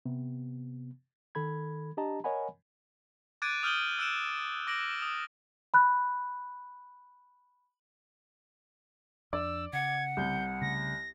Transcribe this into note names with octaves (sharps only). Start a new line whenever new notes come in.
C3 B3
D#3 A4 B5 G#6
D4 G4 D#5 A5 A#5
A#4 C#5 D#5 F#5 G#5 B5
D6 F#6 G#6 A6 D7 D#7
D#6 F6 G6 D#7 F#7 G7
E6 F#6 D7 E7
D6 A#6 D7 F#7
D#6
B5 F#6
F2 D4 D5 E6
C#3 F#5 G#6
C2 G6
C#3 A3 A#6